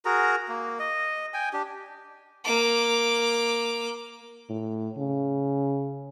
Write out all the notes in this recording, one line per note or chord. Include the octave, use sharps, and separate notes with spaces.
F#4 G#4 A#4 A#5
A#3
D#5
G5 G#5
D4 G4
A#3 D6
A2
C#3